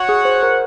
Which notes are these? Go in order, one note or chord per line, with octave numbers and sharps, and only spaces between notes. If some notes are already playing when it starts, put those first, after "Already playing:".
Already playing: F#4 C#5 F#5
G#4
C5
A#4